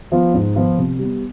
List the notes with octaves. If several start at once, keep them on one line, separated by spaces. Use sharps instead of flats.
F3 B3 F4
G#2
F3 B3 F4
C3
G3 B3